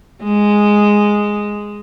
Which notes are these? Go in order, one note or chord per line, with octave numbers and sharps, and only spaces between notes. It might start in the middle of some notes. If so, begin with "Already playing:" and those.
G#3